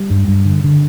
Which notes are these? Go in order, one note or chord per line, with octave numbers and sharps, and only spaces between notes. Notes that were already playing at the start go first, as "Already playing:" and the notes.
Already playing: G3
G2
G2
D3
D3